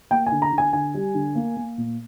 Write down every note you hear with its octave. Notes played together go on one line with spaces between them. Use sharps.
A#3 G5
G#5
D3
A#5
D3
G#5
D3 G#5
G3
D3
A#3
A#3
A#2